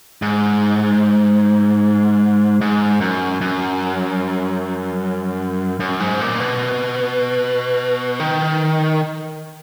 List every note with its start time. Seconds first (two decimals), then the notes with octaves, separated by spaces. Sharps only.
0.22 G#2
2.61 G#2
3.01 F#2
3.41 F#2
5.80 F#2
6.00 G#2
6.21 A#2
6.40 B2
8.20 D#3